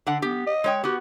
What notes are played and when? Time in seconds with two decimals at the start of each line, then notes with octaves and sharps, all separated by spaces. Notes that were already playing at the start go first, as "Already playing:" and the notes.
0.07 D3 D4 F#5
0.22 B3 G4
0.46 D#5
0.64 G#3 C#5 G5
0.84 B3 F#4 G4